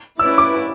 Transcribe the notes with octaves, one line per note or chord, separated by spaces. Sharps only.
C#4 E4 B4 D5 E6
D6